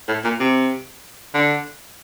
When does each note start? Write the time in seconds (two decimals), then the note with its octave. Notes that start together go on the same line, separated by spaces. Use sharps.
0.08 A2
0.24 A#2
0.40 C3
1.34 D3